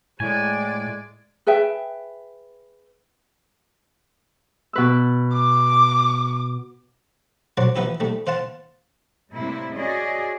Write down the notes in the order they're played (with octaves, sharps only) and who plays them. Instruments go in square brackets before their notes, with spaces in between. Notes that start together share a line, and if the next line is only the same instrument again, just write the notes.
[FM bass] A2 [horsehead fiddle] G#3 D5 [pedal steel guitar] G#5
[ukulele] G#4 B4 E5 G5
[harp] B2 B4 E6
[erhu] D6
[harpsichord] A#1 F#3 C5 D5 F#5
E3 F3 B3 D#4 E4 G4
G#2 G3 A3
C5 F5 F#5 A5 C6
[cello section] A2 C3 G3 A#3 E4
C#4 F#4 G#4 D5 D#5